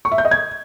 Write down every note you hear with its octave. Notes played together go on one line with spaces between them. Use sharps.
C#6
E5
G6
D#5
G#6